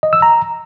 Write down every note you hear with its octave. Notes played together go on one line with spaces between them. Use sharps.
D#5
E6
A#5